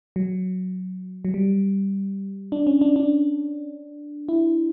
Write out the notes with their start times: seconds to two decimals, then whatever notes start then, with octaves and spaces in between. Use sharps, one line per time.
0.16 F#3
1.25 F#3
1.34 G3
2.52 D4
2.67 C#4
2.81 D4
2.96 D4
4.29 E4